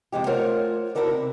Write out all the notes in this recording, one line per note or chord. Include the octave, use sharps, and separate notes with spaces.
F2 C3 G#3 G4
A3 F4 A#4 C5 C#5 F#5
E4 F#4 A4 A#4 D5
C3